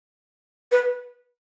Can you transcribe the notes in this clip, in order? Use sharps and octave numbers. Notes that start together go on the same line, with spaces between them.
B4